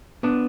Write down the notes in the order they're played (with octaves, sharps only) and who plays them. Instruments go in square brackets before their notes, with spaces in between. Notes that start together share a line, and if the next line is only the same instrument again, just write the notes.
[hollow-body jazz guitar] B3 D4